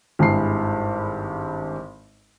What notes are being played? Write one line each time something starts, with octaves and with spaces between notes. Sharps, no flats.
G#1 G2 G#3 E4 C7